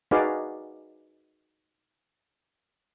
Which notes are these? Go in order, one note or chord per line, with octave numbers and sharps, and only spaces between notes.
D#4 F#4 G#4 B4 D5 F5